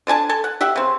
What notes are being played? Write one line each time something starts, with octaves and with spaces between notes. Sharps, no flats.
D3 D5 G#5 A5
A4 G#5 A5
F#5
G4 E5 F#5
C#3 C4